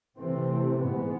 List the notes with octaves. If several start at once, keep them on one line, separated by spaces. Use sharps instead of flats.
C3 E3 A3 C4
G#2 G#3 B3